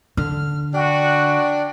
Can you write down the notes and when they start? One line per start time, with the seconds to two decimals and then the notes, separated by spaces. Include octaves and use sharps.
0.17 D3 F6
0.74 D4 F#4 G5